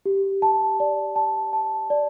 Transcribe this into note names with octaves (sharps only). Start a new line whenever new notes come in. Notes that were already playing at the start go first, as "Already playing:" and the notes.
G4
A5
D5
A5
A5
D5